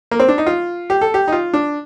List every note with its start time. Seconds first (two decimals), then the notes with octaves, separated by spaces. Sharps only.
0.11 A#3
0.20 C4
0.28 D4
0.38 D#4
0.46 F4
0.90 G4
1.01 A4
1.14 G4
1.28 D#4
1.32 F4
1.53 D4